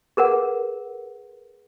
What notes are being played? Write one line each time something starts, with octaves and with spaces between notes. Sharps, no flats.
G#4 A#4 B4 F#5